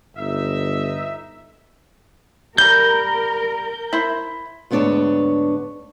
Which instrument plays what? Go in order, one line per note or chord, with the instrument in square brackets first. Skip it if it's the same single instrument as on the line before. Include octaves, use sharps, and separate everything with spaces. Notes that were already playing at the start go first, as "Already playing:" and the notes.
[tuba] G1 [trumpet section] D#4 E5
[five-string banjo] G3 A#5 [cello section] A#4 [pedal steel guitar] G6
[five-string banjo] E4 C5
[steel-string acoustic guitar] D2 G#2 B3 D4 C#5